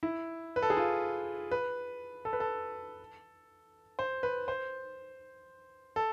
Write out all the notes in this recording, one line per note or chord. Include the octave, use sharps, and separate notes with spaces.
E4
B4
A4
G#4
F4
B4
A4
B4
A4
C5
B4
C5
A4